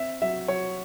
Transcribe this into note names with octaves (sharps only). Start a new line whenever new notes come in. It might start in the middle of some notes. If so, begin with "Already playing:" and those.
Already playing: C4 E5
F#3 E5
F#3 C#5